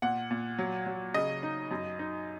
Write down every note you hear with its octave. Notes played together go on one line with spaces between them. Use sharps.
A#2 F#5
A#2
F#3
F#3
C#3 D#5
D#4
F#2
D#4